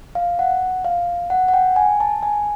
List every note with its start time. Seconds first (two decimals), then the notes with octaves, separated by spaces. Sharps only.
0.15 F5
0.39 F#5
0.85 F5
1.30 F#5
1.48 F#5
1.54 G5
1.76 G#5
2.00 A5
2.23 G#5